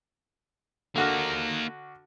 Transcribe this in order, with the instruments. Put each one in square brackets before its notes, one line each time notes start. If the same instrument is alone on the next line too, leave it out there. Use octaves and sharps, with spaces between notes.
[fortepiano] D3 F#4 F6 [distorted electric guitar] A#3 D#4